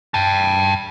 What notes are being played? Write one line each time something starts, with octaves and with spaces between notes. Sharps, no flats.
G5 A5